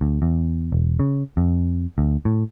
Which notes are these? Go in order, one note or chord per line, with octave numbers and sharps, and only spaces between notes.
D2
E2
E1
C#3
F2
D2
A2